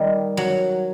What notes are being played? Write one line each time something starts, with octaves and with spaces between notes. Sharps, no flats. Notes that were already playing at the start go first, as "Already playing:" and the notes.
Already playing: D#3 G3
F#3